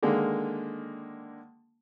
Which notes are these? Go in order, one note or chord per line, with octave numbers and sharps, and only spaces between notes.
D3 D#3 G#3 A#3